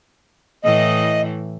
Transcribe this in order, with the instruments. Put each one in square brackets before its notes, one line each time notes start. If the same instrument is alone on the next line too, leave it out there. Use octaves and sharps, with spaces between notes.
[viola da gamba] A2 E3 [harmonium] D#5